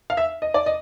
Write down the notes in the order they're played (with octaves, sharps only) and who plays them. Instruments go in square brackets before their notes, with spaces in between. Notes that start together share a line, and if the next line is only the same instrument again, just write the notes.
[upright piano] F5
E5
D#5
D5
D#5